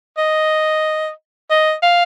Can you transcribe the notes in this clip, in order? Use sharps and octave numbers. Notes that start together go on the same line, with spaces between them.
D#5
D#5
F5